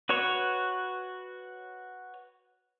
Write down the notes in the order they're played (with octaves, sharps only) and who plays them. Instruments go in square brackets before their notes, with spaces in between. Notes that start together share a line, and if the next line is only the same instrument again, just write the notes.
[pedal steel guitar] F#4 B4 C#5 C#6